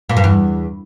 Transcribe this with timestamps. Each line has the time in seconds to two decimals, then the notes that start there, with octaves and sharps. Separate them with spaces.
0.09 A#2
0.17 G2
0.24 E2